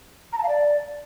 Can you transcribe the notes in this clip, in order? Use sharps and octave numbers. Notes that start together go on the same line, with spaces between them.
A#5
A5
F5
D5